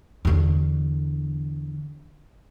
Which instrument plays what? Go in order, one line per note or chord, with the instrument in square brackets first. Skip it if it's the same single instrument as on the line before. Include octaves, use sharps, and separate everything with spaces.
[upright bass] E2 D3